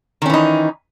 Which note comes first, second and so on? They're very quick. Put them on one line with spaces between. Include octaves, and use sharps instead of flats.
D#3 C#4 E3 D#4